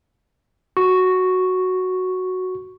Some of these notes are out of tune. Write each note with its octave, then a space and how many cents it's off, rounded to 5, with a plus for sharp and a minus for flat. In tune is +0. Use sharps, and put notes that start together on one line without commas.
F#4 +0 C#6 +0